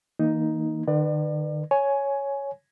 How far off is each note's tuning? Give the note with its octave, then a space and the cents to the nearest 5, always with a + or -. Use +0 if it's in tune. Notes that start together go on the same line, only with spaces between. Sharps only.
E3 -45 A#3 +0 D#4 +5
D#3 -45 B4 +0 D5 +35
C#5 +0 G#5 +10